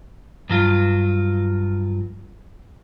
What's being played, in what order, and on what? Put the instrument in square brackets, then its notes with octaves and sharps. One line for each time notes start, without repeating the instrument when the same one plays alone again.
[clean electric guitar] G2 F#3 F4